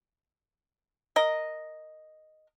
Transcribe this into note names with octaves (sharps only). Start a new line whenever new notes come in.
A#4 D#5